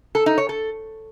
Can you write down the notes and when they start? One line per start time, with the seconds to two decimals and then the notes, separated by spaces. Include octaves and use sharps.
0.15 A4
0.26 D#4
0.38 C#5
0.49 A4